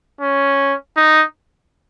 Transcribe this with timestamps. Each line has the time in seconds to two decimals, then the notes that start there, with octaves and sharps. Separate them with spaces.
0.21 C#4
0.97 D#4